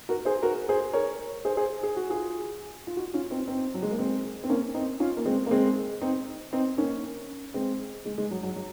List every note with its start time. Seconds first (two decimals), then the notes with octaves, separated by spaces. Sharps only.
0.09 F#4 A#4
0.25 G#4 C5
0.42 F#4 A#4
0.69 G#4 C5
0.93 A#4 C#5
1.45 G#4 C5
1.57 G#4 C5
1.83 G#4
1.96 F#4
2.10 F4 G#4
2.87 F4
2.97 D#4 F#4
3.14 C#4 F4
3.31 C4 D#4
3.47 C4 D#4
3.74 F#3
3.82 G#3
3.91 A#3
3.98 G#3 C4
4.44 C4
4.49 A#3 C#4
4.74 C4 D#4
5.00 C#4 F4
5.17 A#3
5.25 G#3 C4
5.46 A#3
5.51 G#3 C4
6.01 C4 D#4
6.53 C4 D#4
6.78 A#3 C#4
7.54 G#3 C4
8.05 G#3
8.18 G#3
8.31 F#3
8.43 F#3
8.56 F#3